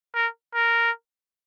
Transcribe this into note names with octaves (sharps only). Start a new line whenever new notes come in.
A#4
A#4